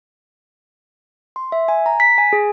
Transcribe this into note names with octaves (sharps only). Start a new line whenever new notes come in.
C6
E5
G#5
A#5
B6
G#5
G#4